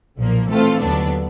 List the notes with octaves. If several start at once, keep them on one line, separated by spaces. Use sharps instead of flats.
B1 A#2 F3 A#3
E3 A3 C4 F4 A4
D#2 D3 F#3 B3 D4